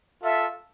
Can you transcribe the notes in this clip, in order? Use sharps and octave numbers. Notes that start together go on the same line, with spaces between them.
F4 A4 E5